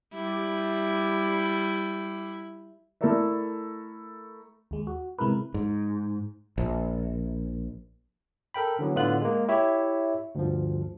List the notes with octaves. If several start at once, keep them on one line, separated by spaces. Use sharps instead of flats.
G3 E4
A3 E4 A4 A#4 D5 E5
D#2 G#3
F#4
C3 G#3 E4 A#4 B4
G#2
A#1
A4 A#4 G5 B5
D3 E3 F#3 B3
A2 D3 B3 F4 F#6
G#3 A#3
E4 G4 C#5 E5
D2 G2 F3